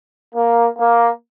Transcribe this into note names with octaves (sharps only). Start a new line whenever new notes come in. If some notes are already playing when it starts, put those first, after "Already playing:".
A#3
A#3